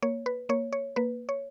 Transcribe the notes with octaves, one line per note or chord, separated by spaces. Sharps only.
A#3 C#5
B4
A#3 C#5
C#5
A#3 B4
C#5